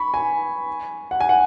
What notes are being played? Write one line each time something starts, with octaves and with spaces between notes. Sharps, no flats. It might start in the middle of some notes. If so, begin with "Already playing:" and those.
Already playing: B5 C#6
G#5
F#5
G#5
F#5